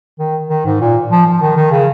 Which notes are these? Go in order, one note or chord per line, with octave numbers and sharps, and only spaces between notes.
D#3
D#3
G#2
A#2
F3
F3
D#3
D#3
C#3